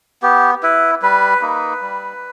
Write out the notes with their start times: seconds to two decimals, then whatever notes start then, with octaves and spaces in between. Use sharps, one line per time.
0.23 B3 G4
0.63 E4 B4
1.02 G3 B4
1.42 A#3 D#4
1.82 G3